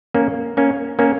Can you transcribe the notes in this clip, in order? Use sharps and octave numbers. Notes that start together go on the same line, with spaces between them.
A#3 C#4
A#3 C#4
A#3 C#4